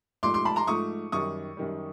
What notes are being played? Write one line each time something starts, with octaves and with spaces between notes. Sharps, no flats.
G#2 F3 A3 C6 D6
C6 D6
A5 B5
A#5 C6
G#2 F3 A3 C#6 D#6
F#2 D#3 G3 C#6 D#6
F#2 D#3 G3